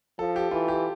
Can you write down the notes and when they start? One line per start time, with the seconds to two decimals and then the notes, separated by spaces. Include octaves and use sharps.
0.19 F3 A4
0.36 G4
0.51 E3 F4
0.68 G4